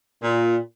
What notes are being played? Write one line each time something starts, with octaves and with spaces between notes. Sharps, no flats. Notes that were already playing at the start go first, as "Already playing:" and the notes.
A#2